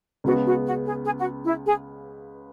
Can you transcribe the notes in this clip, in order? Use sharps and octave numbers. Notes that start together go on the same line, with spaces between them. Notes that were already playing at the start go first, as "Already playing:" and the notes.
C#2 C#3 G#3 B3 F#4
F#4
F#4
G#4
G#4
F#4
E4
G#4